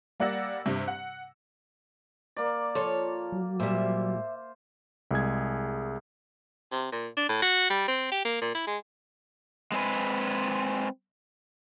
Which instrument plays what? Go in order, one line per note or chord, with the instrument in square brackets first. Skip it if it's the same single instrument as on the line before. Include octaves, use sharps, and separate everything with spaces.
[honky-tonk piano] G3 A#3 D5 F#5 E6 A#6
G2 C3
F#5
[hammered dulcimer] A#3 D5
[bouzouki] F3 C#5 [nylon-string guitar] A4
[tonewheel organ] F#3
[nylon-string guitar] A#2 G3 [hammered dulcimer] C5 [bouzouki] E5
[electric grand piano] C2 G#3 G#4 G#6
[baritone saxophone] C3
A#2
D4
A2
F#4
G3
C4
G4
A#3
A#2
E4
G#3
[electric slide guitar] G#3 C4 G#4 B4